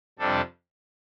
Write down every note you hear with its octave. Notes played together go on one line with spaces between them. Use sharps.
F2 C3 G3 D4 A4